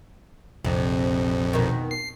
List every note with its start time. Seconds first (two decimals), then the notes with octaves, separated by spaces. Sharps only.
0.65 A#1 F2 C3
1.53 B2 D#3
1.91 C7